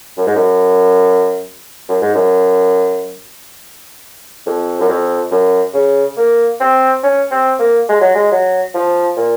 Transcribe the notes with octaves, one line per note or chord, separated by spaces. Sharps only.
F#2
G#2
F#2
F#2
G#2
F#2
F2
F#2
F2
F#2
C#3
A#3
C4
C#4
C4
A#3
G#3
F#3
G#3
F#3
F3
A#2